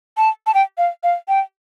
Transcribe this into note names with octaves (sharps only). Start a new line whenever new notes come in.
A5
A5
G5
F5
F5
G5